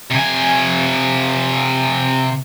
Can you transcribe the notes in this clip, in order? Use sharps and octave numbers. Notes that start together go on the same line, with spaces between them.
C3 G#5